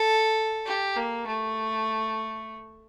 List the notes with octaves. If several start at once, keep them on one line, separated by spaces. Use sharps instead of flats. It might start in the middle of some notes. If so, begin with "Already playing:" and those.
Already playing: A4
G4
A#3
A3